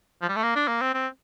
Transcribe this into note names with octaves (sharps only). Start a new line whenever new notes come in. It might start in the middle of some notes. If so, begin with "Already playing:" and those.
F3
G3
A3
A#3
D4
A#3
C4
C4